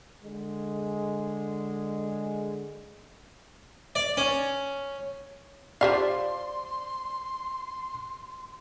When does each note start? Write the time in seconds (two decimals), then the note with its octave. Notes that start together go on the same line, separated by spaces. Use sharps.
0.24 D3 G#3
3.95 D5
4.17 C#4
5.81 F3 G4 D5 F5 C6